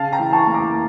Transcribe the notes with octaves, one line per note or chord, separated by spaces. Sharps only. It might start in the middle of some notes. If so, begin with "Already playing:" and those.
Already playing: C#3 F5 A5
G5 A#5
E3
A5 C#6
A#3
A#5 D6